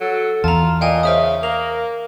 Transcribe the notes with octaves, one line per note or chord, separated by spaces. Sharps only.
F#3 A4
E2 F4 A5 A#5
A#2 D#5 F5 G5 G#5
C#3 C5 E5 D#6
A#3 A#4 F7